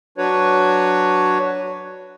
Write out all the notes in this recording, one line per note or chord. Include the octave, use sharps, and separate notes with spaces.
F#3 D4 F#4 B4 C#5